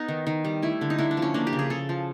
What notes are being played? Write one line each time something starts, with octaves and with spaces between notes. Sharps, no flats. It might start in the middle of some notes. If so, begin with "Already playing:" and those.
Already playing: B3 D#4
D#3
D#3
G3
A3 E4
D3
D#4
D3 E4
D4
F3
C#4
A#3 D4
G4
C#3
G#4
C#3 A4
F3